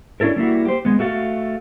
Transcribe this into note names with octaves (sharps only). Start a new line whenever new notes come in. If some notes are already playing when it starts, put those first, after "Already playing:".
C#4 D4 E4 A4 A#4
G3 A#3 E4 F#4
G4 C5
G#3 B3
A3 F#4 A4 F5